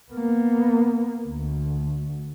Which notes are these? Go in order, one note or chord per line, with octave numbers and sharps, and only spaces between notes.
A#3 B3
D2